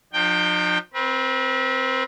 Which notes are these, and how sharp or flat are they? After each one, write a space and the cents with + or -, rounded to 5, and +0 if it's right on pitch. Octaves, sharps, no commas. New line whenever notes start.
F3 +40 D#4 -40 G5 +0
C4 +0 B4 -40